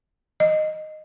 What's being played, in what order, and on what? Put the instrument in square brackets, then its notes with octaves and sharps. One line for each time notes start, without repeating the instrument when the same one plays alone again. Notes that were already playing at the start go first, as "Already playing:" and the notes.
[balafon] D#5